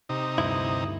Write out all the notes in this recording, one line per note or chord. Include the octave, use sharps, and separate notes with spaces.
C3 D#4
D2 G2 E4